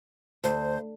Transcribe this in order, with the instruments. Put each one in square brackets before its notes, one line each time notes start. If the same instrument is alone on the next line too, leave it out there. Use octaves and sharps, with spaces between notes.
[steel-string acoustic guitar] D2 [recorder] C5